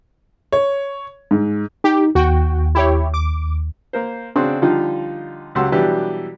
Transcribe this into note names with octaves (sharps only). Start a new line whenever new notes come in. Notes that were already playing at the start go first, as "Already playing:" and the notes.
C#5
G#2
D#4 G4
D#2 F#4 G5
E4 G4 C#5
D6
A#3 A#4 C5
C#3 C4 D4 F#4 G#4 C6
D3 F3 G3 D#4 F4
C#2 F#3 G4 F#5 C6 E6
B2 E3 F#3 G3 D4 G4